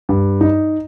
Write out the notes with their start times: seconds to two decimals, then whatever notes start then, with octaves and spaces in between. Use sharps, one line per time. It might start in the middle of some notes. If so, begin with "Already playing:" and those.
0.09 G2
0.41 D#4